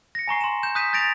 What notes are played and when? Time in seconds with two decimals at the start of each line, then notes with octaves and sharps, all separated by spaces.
0.15 A#6 C#7
0.28 G#5 A#5 C#6 C7
0.41 C6 E7
0.63 G6 E7
0.75 D#6 F#6 G6 B6 D#7 E7
0.93 G6 A6 A#6 D7 F7